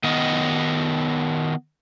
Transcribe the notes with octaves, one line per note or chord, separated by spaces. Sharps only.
D#3 B3 D#5